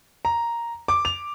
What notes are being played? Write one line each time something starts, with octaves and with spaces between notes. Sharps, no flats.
A#5
D6
F7